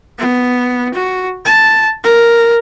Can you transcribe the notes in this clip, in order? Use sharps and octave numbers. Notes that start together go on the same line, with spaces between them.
B3
F#4
A5
A#4